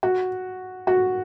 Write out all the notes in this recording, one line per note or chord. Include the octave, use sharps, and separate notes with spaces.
F#4
F#4